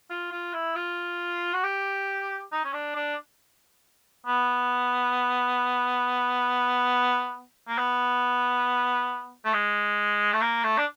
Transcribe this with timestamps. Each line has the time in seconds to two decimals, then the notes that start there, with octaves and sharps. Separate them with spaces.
0.10 F4
0.32 F4
0.53 E4
0.76 F4
1.53 F#4
1.64 G4
2.52 D#4
2.64 C#4
2.73 D4
2.95 D4
4.27 B3
7.68 A#3
7.78 B3
9.45 A3
9.54 G#3
10.33 A3
10.41 A#3
10.63 A3
10.78 D4